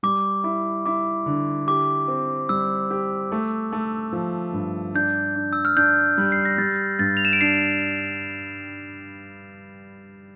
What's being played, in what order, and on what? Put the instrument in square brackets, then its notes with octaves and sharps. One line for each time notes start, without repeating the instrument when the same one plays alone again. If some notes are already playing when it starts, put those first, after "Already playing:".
[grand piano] G3 [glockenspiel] D6
[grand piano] E4
[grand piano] E4 [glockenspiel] D6
[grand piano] D3
[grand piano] G4 [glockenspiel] D6
[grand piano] C4
[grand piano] G3 [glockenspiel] E6
[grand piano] G4
A3
A3
F3
G2
[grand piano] D4 [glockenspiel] G6
[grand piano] D4
[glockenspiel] E6
F6
[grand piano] D4 [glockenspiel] G6
[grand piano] G3
[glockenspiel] C7
A#6
[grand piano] G3 [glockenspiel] A6
[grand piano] G2 [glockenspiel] A6
[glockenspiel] F7
E7
D7
[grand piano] D4 [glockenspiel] C7